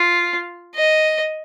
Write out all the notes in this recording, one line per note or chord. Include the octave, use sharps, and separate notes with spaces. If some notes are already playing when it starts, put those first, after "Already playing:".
Already playing: F4
D#5